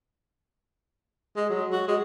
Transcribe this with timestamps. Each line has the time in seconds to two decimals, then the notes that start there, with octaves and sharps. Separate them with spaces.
1.36 G#3
1.50 F#3
1.72 F#4
1.88 G#3